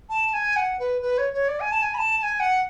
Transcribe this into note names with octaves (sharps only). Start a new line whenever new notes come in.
A5
G#5
F#5
B4
B4
C#5
C#5
D5
G#5
A5
G#5
B5
A5
A5
G#5
F#5